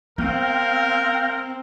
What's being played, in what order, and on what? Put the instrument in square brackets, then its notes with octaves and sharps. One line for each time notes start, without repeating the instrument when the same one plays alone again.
[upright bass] B3 [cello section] C4 [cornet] A#4 [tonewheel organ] F5 G5